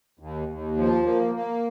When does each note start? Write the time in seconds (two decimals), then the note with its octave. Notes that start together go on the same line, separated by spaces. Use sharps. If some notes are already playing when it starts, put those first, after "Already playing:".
0.19 D#2
0.48 D#2
0.77 F3
1.06 A#3
1.35 A#3